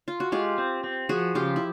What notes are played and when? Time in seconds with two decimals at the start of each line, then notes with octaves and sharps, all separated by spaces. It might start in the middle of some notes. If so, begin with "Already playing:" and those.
0.08 F4
0.20 F#4
0.32 G#3 F4 G4
0.58 C4
0.84 C4
1.09 F3 F#4 G#4
1.34 C#3 F4 G4
1.56 E4